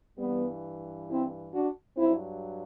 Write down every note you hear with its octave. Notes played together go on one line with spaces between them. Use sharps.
G2 E3 G3 B3
C4 E4
D4 F#4
G2 F#3 C4 E4